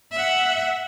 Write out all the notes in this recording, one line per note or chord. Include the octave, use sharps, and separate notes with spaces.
E5 F#5